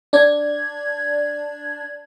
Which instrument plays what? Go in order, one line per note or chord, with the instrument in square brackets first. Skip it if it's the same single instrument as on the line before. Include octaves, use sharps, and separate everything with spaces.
[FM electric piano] D4 D5 G#6